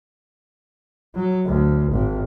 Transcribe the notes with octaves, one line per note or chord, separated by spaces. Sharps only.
F#3
D2
G#1